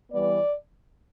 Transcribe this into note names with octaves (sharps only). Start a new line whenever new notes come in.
E3 G3 B3 D5